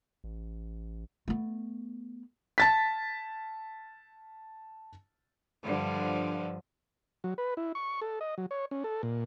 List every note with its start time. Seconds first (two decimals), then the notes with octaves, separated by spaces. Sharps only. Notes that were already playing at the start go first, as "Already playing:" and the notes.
0.24 A1
1.28 A3 B3
2.58 A5 A6 B6
5.65 G2 D3 F3
7.24 F#3
7.38 B4
7.57 E4
7.75 C#6
8.01 A4
8.21 D#5
8.38 F#3
8.51 C#5
8.71 C#4
8.84 A4
9.03 A#2